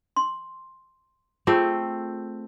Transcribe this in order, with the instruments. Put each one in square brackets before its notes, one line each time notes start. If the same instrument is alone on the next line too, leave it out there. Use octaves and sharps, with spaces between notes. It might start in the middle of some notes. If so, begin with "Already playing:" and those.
[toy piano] C6
[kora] A3 C4 [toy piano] F4 G#4 A4